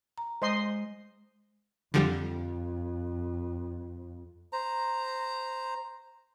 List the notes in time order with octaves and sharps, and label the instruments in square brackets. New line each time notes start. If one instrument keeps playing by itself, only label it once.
[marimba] A#5
[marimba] G#3 [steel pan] C5 D#5 C6
[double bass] F2 [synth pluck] D3 F3 G3
[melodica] C5 A#5